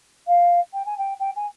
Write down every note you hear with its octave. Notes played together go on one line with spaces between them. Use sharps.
F5
G5
G#5
G5
G5
G#5